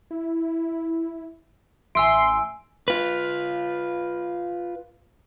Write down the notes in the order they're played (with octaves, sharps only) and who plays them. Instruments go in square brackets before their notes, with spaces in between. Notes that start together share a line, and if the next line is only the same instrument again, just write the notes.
[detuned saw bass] E4
[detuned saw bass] A1 [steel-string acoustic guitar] E5 [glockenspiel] G#5 E6 D7 [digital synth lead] C6
[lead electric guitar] F4 B4